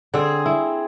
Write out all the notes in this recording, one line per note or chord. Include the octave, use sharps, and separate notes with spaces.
D3 C4 G#4
E4